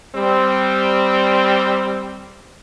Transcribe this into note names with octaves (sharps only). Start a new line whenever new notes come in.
G3 C4